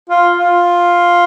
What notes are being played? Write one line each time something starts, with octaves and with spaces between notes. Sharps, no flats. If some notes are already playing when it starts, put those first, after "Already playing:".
F4
F4